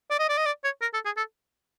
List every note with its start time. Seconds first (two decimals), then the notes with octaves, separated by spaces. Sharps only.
0.11 D5
0.19 D#5
0.29 D5
0.38 D#5
0.46 D5
0.64 C#5
0.82 A#4
0.94 A4
1.05 G#4
1.17 A4